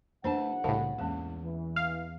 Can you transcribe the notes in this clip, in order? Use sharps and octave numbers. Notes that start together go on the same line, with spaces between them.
F#1 A3 D4 B4 C5 F#5 A5
C2 A2 C#3 F5 A5 B5
E2 G#3 A#3 C#4
E3
F5